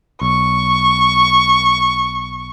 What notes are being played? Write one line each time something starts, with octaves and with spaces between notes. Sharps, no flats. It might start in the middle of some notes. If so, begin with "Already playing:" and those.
B1 C#6